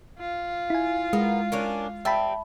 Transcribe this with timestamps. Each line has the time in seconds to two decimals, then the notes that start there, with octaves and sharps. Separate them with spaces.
0.20 F4
0.70 E4 G#5
1.13 G#3 A#3 B3
1.52 A#3 C#4 D4
2.05 G3 C4 E5 A5 B5